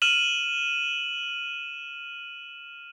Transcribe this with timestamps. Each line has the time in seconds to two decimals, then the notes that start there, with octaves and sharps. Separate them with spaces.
0.02 F6 D#7 E7 F#7